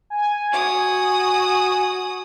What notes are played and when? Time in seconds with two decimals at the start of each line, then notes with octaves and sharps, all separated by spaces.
0.10 G#5
0.52 F#4 D#6